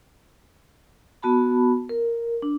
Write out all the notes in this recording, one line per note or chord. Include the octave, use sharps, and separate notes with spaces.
B3 F#4 A5 B5
A#4
D4